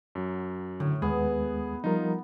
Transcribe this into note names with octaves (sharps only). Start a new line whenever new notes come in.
F#2 F#3
A2 D3
D#2 G#3 B3 G#4
F3 G3 D#4 F4 A#4